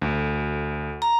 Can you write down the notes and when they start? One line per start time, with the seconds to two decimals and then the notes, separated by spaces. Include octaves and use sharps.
0.02 D2
1.02 A#5